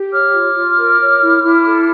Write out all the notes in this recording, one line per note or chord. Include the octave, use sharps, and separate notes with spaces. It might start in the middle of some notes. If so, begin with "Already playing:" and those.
Already playing: G4
C#5 D6 F6
F4
F4
A#4
C#5
E4
E4
A4